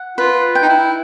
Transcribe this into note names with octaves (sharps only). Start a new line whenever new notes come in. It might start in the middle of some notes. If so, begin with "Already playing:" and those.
Already playing: F#5
F4 B4
G5
D#4
E4